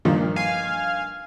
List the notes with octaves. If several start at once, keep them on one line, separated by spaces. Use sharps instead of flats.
G2 A#2 D#3 F3
F5 G#5